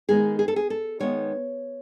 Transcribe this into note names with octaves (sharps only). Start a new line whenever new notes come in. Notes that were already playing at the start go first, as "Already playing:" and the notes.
D#3 G#3 B3 D#4 G#4
G#4
A4
G#4
A4
D#3 G#3 B3 D#4 C#5